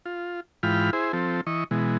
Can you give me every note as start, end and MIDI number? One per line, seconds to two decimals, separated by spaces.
0.06 0.40 65
0.63 0.90 44
0.63 0.90 52
0.63 0.90 65
0.63 0.90 79
0.63 0.90 83
0.63 0.90 89
0.93 1.12 64
0.93 1.12 68
0.93 1.12 72
1.13 1.41 53
1.13 1.41 60
1.13 1.41 69
1.47 1.64 52
1.47 1.64 75
1.47 1.64 85
1.71 1.97 47
1.71 1.97 52
1.71 1.97 56